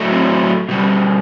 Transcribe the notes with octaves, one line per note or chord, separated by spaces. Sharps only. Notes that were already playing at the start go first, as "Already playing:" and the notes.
Already playing: A2 F#3 A3
C4
B2 G3